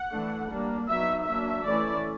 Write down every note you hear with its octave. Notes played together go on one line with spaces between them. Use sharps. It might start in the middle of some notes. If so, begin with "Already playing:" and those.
Already playing: F#5
E3 A3 D4
G3 A#3 D4
F#3 B3 D#4 E5
F#3 A#3 D4 E5
E3 A3 C#4 E4 D5